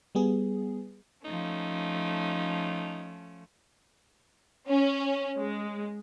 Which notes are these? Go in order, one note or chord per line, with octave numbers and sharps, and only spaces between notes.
G3 B3 G#4
F3 A3 C#4 D#4
C#4
G#3